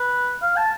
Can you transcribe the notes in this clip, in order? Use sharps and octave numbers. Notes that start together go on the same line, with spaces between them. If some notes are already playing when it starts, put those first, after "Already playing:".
Already playing: B4
F5
A5